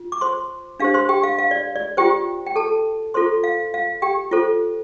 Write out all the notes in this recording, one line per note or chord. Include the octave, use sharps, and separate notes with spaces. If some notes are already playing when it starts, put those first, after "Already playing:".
Already playing: F4
D6
C5 C6
D4 G4 C5 F5
C5 C6
G4 G5
F5
F5
D5
D5
F4 G4 C5 G5
G5
A4 A5
F4 A4 C5 C6
F5
F5
G4 G5
F4 A4 C5